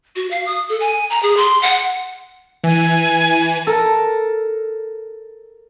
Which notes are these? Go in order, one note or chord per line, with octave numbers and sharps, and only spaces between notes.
F#4
F5
D#6
A4
G#5
A#5
G#4
C6
F#5
E3 G#5
A4 A#4